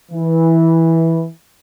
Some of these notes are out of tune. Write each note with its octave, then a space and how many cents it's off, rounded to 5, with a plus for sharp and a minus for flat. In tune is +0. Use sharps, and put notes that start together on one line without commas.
E3 -10